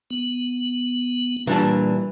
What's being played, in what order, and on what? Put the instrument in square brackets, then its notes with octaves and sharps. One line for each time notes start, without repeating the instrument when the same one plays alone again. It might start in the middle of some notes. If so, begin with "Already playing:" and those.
[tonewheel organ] B3
[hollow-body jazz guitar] A#2 D4 A5 [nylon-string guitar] E3 [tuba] G3